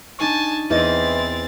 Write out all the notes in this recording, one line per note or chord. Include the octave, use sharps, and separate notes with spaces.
D4 D#4 G#5 A5 C#6
E2 E3 C4 D#5 A6